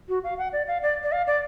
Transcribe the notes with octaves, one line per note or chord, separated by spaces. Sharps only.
F#4
F5
F#5
D5
F5
D5
D5
F5
D5